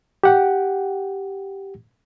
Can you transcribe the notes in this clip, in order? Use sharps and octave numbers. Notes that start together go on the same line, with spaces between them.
G4 F#5 G5